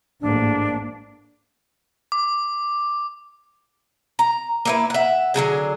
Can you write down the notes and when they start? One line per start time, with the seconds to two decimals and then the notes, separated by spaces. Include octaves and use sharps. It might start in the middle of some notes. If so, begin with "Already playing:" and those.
0.21 A1 G#2 A#3 D4
2.12 D6
4.19 A#5
4.65 A#3 E4 B4
4.90 E5 F#5
5.34 D3 F#3 F#4 G#4